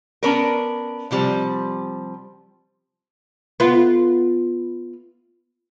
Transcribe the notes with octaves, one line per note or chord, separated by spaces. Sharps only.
B3 C#4 D4 A#4
C3 F3 G3 C4
B3 F4